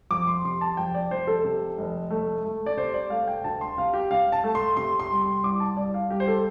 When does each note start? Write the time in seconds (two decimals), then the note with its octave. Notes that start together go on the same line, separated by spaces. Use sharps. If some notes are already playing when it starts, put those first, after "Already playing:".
0.11 F2 D6
0.27 C6
0.44 C3 C6
0.61 A5
0.77 F2 G5
0.95 D5
1.11 F1 C5
1.27 A4
1.44 C3
1.78 F1
2.10 A3
2.45 A3
2.66 D5
2.77 C3 C5
2.94 D5
3.10 A3 F5
3.27 G5
3.44 D2 A5
3.61 C6
3.78 C3 F5
3.94 G4
4.11 C3 F5
4.32 A5
4.44 A3
4.55 C6
4.77 C3 C6
5.00 C6
5.11 G3
5.21 C6
5.43 C2 D6
5.60 A5
5.77 C2 D5
5.94 F5
6.10 G3 G4
6.20 C5
6.28 A4